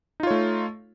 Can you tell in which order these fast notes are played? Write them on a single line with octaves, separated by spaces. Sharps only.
D#4 F4 C#5 A3